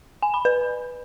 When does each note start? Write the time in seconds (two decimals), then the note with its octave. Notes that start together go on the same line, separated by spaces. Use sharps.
0.23 G#5
0.34 B5
0.45 B4